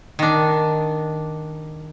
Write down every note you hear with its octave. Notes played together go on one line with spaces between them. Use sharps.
D#3 D4